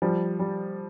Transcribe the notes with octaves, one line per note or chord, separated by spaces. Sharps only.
F3 G3
G3